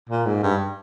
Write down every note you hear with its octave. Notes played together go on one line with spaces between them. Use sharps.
A#2
G#2
G2